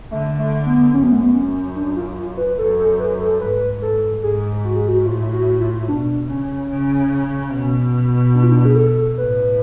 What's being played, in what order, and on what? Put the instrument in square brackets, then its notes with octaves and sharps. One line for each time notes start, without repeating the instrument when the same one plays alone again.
[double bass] D3 [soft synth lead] A3
[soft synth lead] A3
B3
[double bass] F#2 [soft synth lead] C#4
[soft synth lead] B3
A3
B3
C#4
D4
F4
F4
B4
[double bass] F#2 [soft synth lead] A4
[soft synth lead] A4
B4
A4
[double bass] G#2 [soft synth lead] B4
[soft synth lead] A4
[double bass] G#2 [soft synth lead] G#4
[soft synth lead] F#4
G#4
F#4
[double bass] A2 [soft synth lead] F4
[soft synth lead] F#4
F4
[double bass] B2 [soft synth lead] D4
[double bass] C#3 [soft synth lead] C#4
[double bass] C#3
B2
[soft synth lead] D4
F4
D4
G#4
A4
[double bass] A2 [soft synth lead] B4